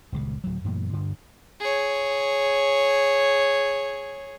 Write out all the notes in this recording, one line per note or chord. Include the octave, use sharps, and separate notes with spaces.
D#1 C#2 C#3
D1 F#3
F#2 A#2 E3 A3
D2 G2 D3
G#4 C#5